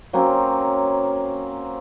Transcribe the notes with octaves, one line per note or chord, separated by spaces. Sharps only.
F#3 A#3 C4 C#4